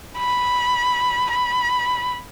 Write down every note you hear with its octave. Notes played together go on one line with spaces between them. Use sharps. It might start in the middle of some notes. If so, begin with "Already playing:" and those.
B5
B5